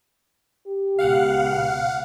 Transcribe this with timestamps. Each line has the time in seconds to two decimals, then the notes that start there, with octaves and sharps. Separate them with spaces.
0.67 G4
0.99 C#2 B2 F5 F#5